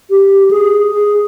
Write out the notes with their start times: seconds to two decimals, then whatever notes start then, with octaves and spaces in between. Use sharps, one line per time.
0.10 G4
0.51 G#4
0.91 G#4